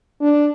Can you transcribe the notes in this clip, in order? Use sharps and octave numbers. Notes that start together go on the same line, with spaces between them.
D4